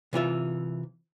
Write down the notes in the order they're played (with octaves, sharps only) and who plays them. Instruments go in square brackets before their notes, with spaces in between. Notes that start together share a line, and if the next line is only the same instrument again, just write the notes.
[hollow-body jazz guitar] C3 E3 F4 E5